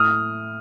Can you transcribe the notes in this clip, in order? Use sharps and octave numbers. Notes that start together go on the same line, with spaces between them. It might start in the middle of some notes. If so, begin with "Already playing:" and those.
Already playing: A2 D#6 F6